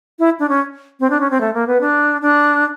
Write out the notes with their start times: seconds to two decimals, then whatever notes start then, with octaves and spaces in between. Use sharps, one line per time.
0.19 E4
0.40 D4
0.49 C#4
1.00 C4
1.10 D4
1.21 C#4
1.31 C4
1.41 A3
1.54 A#3
1.67 B3
1.81 D4
2.22 D4